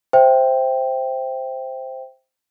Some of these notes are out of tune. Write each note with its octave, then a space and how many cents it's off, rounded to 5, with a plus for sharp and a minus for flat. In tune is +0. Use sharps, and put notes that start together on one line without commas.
C5 +0 E5 +0 G5 +0